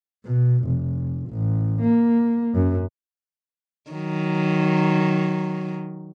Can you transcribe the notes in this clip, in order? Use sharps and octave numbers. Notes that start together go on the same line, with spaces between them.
B2
F1
A1
A#3
F#2
D#3 F#3